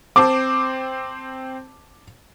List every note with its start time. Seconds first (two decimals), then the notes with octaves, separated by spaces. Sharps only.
0.16 C4 C5 A5 D6